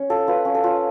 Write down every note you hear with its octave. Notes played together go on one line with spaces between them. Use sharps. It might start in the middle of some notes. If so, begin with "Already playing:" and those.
Already playing: C#4 C#5
F4 A4
F4 B4
C#4
A4
F4